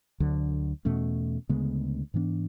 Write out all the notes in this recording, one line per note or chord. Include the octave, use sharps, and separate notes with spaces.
D2 D3 F#3
E2 B2 A3 C#4
D2 C#3 G#3 B3
G#2 E3 B3 D4